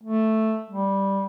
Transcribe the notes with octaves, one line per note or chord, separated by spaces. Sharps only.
A3
G3